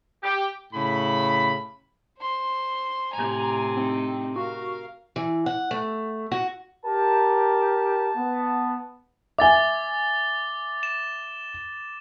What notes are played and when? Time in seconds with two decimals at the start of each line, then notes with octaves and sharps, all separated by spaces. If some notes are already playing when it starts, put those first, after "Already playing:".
0.23 G4
0.73 A2 C#3 B5
2.19 C5 C6
3.13 A2 C3 G#5 A#5
3.77 C4 D#4
4.36 F#4 A#4 F5
5.16 E3
5.46 F#5
5.71 A3
6.32 F#4
6.85 G4 A#4 A5
8.16 B3
9.38 E5 G#5 D6 A6 G7
10.83 E7